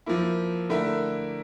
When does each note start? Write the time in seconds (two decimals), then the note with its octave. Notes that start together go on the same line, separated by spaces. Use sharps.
0.06 F3 A#3 E4
0.69 D3 A3 E4 A#4 E5